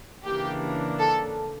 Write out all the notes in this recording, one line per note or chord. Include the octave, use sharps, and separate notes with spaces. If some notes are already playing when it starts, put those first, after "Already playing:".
C#3 E3 A#3 D4 G4
A4